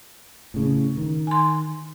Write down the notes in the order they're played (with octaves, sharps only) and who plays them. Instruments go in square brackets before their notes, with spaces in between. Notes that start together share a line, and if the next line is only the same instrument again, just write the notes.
[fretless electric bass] A2 C#3
D#3
[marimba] G#5 C6